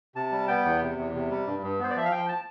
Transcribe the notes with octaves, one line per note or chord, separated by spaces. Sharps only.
C3 A5
G3
B3 G5
E2
C3
E2
C3
G3
G2
G2
B3 C5
D5
F3 E5
F5
F3 G5
A5